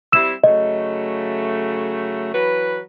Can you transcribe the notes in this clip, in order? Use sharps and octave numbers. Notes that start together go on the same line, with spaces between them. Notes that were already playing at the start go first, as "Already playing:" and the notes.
G3 C4 E4 E6 E7
C#3 F#3 A3 D#5
E3 F#3 B4